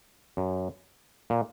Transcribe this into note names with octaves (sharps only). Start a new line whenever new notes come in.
F#2
A#2